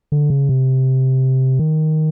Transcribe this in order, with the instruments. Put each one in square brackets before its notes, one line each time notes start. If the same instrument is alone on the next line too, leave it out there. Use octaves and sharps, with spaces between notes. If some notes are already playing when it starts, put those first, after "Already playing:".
[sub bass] D3
C#3
C3
D#3